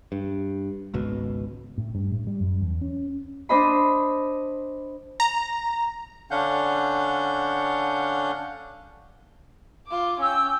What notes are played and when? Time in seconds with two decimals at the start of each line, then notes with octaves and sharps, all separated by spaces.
0.12 G2
0.94 G#1 C#2 B2
1.78 A2
1.95 G2
2.12 A2
2.27 G3
2.40 F#2
2.61 E2
2.81 C#4
3.49 D4 C5 D#5 B5
5.20 A#5
6.31 D3 C#4 D4 F5 F#5 G6
9.87 F4 D6
10.20 C#4 G5 E6